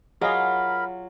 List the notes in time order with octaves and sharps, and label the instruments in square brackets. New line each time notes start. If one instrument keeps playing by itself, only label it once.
[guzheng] F#3 F4 [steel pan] G#4 D#5 F5 [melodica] A#4 B5